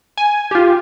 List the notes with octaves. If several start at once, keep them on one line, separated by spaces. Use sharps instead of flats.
G#5
F4 G4